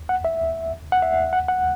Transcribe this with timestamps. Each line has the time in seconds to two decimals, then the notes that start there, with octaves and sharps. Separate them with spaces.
0.09 F#5
0.25 E5
0.92 F#5
1.02 E5
1.33 F#5
1.48 F#5